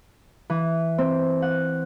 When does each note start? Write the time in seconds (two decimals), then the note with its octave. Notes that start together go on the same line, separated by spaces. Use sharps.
0.50 E3
0.98 C4
1.42 F#5